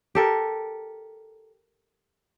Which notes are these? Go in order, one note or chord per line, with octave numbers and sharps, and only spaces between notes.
G4 A4 A#4